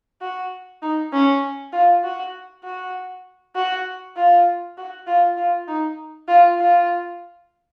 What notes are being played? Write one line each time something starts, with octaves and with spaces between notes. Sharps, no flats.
F#4
D#4
C#4
F4
F#4
F#4
F#4
F4
F#4
F4
F4
D#4
F4
F4